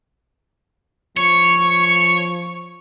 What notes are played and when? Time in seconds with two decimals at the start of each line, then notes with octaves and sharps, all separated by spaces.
1.17 F3 C#5 C#6